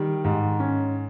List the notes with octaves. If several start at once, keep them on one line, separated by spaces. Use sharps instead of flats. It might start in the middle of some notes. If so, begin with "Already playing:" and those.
Already playing: D#3 G3
G#2
C#4